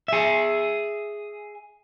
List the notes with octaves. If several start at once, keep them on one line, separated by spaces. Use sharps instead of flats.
G#4 E5